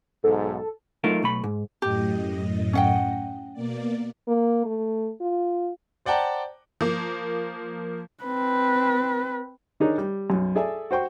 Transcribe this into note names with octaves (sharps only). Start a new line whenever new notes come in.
B1 G#2 A4
F#3 A3 D#4 F4 A#4 F5
B1 A3 B5
G#2
F#2 A2 G4 D#5
C#4 F#5 G5
B2 A#3 D5
A#3
A3
F4
C5 D5 F#5 G5 A5 A#5
F3 A#3
C4 B4
D#3 D4 D#4 G#4 A#4 C#5
G3
B1 F#2
G#4 A4 D5 E5 G#5
F#4 C5 G5 C#6